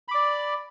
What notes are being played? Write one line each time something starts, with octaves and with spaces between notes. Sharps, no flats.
D5 B5 D6